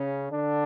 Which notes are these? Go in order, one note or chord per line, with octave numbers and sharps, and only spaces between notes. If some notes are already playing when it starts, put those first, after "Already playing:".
Already playing: C#3 C#4
D3 D4